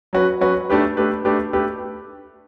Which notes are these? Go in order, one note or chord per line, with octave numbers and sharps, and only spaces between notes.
F#3 C#4 F#4 B4
F#3 C#4 F#4 B4
A3 D4 G4 B4
A3 D4 G4 B4
A3 D4 G4 B4
A3 D4 G4 B4